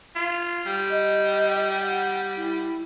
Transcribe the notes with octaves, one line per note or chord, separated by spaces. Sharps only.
F4
G3
D#5
F#5
E4